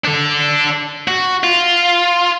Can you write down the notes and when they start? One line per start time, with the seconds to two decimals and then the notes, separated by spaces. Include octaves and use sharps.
0.05 D4 A4
1.08 F#4
1.44 F4